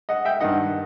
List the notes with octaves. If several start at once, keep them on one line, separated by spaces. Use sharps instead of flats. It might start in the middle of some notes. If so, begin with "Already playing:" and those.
D#5 F#5
E5 G5
G2 D#3 D#5 F#5